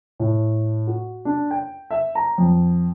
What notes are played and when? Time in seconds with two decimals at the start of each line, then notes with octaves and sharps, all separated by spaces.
0.20 A2
0.87 F#4
1.25 D4
1.51 G5
1.91 E5
2.15 A#5
2.38 F2